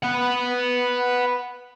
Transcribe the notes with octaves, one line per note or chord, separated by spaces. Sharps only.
B4 F#5